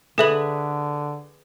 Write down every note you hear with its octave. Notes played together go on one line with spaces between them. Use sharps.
D3 G#4 A4 B4 E5 F#7